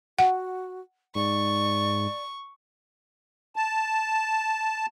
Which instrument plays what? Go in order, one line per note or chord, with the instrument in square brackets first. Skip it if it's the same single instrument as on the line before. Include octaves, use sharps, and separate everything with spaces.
[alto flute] F#4 [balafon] F#5
[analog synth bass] G#2 [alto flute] D5 [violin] C#6
[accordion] A5